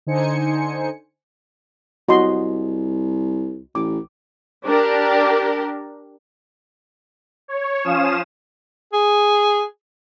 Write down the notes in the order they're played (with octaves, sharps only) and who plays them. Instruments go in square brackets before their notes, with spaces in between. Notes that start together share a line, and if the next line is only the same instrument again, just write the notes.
[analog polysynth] D3 D#4 C5 G#5 C#7
[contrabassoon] C2 [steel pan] F#4 D#5 C6
[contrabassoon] A1 [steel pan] D6
[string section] D4 G4 A#4
[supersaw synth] C#5
F3 C#4 F5 D#6 E7
[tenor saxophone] G#4